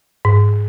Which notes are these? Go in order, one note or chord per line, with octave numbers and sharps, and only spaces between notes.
G#2